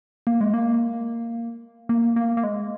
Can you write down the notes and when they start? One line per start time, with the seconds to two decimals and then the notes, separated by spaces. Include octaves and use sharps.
0.27 A#3
0.41 G#3
0.54 A#3
1.89 A#3
2.16 A#3
2.37 A#3
2.44 G#3